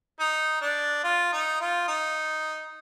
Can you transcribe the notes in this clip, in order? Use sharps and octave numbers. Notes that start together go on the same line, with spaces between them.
D#4
D4
F4
D#4
F4
D#4